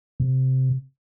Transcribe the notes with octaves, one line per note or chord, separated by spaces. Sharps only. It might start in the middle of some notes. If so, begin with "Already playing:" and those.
C3